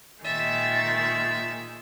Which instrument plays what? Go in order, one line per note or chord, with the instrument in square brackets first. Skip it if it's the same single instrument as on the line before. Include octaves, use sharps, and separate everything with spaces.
[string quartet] A#2 D#3 G#3 [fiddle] E5 [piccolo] A6